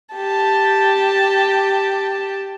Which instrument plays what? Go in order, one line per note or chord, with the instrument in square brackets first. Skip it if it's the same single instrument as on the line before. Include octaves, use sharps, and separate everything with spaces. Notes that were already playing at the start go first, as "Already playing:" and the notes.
[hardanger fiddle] G4 A5